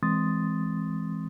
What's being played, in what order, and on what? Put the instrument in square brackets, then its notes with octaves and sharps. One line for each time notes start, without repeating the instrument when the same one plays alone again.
[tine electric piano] E3 G#3 C4 C6 D#6 A6